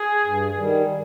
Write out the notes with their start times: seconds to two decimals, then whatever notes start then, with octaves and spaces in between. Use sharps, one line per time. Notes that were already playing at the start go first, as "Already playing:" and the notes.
Already playing: G#4
0.23 G2
0.56 D#3 G3